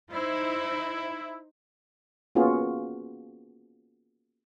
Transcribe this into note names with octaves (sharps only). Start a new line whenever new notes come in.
D#4 E4 C5
A#3 B3 C#4 F4 F#4 G#4